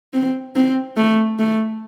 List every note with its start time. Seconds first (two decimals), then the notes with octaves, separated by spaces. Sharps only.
0.13 C4
0.56 C4
0.97 A3
1.39 A3